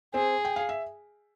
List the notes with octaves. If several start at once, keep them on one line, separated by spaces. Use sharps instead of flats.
C4 G#4 C5
G5
F5
E5